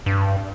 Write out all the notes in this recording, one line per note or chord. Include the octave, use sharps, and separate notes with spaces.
G2